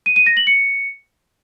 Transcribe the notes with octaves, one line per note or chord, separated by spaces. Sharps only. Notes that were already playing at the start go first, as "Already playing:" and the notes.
D#7
D#7
A#6
F#7
C#7